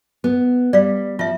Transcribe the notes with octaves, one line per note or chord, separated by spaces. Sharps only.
B3
G3 D5 F5
F3 F4 E5